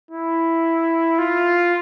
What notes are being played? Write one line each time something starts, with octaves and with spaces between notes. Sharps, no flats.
E4
F4